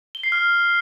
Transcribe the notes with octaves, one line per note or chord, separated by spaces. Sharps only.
G7
C7
F6